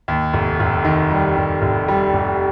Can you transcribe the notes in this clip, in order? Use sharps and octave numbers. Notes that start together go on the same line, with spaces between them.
D#2
F1
F1
D#3
G3
F1
F1
G3
F1